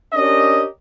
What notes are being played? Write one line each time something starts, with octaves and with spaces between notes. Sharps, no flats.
C#4 D4 G4 A#4 C#5 D#5